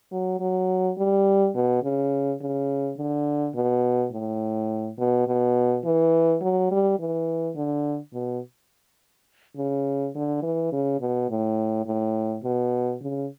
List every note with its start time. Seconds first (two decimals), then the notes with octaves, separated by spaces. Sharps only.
0.11 F#3
0.40 F#3
0.98 G3
1.55 B2
1.83 C#3
2.41 C#3
2.98 D3
3.55 B2
4.12 A2
4.98 B2
5.27 B2
5.85 E3
6.41 F#3
6.71 G3
6.99 E3
7.56 D3
8.13 B2
9.57 C#3
10.15 D3
10.43 E3
10.72 C#3
11.00 B2
11.29 A2
11.86 A2
12.43 B2
13.02 C#3